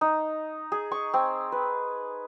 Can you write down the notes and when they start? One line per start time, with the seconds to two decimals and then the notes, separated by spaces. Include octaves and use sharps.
0.01 D#4
0.72 G#4
0.92 C#6
1.14 C4
1.52 B4